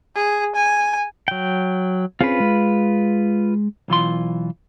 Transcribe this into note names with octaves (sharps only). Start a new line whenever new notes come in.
G#4
G#5
F#3 G5
C4 C#4 F4 G#4 B4
G#3
B1 E3 F4 C6